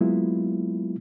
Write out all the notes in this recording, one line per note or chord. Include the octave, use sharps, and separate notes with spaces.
F#3 G#3 A#3 B3 E4 F4